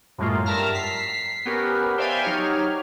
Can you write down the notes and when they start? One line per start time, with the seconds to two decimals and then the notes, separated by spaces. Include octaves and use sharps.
0.18 F#2 A2 F#3 G#3 A#3 F4
0.46 G2 A#4 E5 A5 A#5 F6
0.74 B6 C7
1.46 B3 C#4 G4 A#4
1.98 C5 D5 E5 F5 G5 G#5
2.23 F#3 D#4 G4 C#5 F6